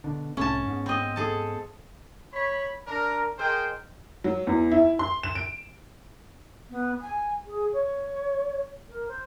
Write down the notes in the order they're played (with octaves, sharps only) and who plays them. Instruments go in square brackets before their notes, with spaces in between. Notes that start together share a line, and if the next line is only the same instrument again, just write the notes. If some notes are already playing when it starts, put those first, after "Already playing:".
[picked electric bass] B2 D3
[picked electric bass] C2 A2 C3 [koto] C#4 A5
[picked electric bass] G#2 B3
[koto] C4 D#5
G#4 A4 A5
[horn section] C#5 B5
D4 A#4
G#4 A#4 C5 D#5 G5
[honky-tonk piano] F#3
E2
E4
C6
E7
D7
[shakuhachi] B3
G#5
G#4
C#5
A#4
C5